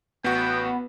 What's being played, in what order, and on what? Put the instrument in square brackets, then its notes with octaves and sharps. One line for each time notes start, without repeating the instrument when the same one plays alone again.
[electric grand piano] A1 F#4 [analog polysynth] B3 [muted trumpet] G5